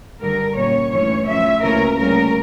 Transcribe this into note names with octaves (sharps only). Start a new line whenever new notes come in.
G2 D3 G3 A#4
A#2 G3 C#4 C#5
G2 E3 A3 C#4 C#5
C#3 F3 A3 C#4 E5
D2 C#3 E3 A#3 C#4 A#4
D2 C#3 G3 A#3 C#4 A#4